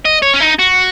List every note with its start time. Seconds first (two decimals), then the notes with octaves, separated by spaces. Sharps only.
0.05 D#5
0.22 C#5
0.33 C#4
0.40 D#4
0.59 F#4